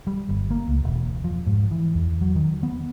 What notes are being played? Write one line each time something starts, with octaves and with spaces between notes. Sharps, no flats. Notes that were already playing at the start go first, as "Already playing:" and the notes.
G3
G1
A#3
C#2
E1
F3
G#2
E3
E2
F#3
D#3
B3